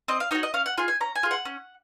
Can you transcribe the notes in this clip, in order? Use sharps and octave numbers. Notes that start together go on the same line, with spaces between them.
C4 D#5
F5
D#4 F#4 C#5
D#5
C#4 F5
F#5
F4 G#4 G#5
G#5
C#4 A#5
G#5
F4 G#4
F#5
C#4